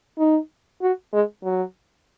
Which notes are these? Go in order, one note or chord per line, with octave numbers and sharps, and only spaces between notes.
D#4
F#4
G#3
F#3